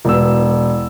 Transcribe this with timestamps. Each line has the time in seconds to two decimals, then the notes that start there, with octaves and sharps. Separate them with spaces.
0.05 E1 B3 E6